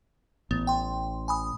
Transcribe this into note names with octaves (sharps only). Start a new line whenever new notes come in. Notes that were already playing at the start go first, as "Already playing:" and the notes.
A1 B3
G5 C6
G#5 B5 D#6